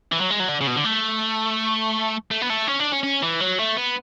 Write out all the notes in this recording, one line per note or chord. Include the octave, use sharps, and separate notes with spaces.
E3
F#3
G#3
F#3
D3
C#3
B2
D3
A3
A3
B3
A3
C#4
D4
C#4
C#4
E3
F#3
A3
B3